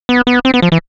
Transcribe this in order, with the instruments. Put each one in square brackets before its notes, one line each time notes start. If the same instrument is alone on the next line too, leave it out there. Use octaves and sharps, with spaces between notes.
[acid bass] B3
B3
C4
B3
F3
E3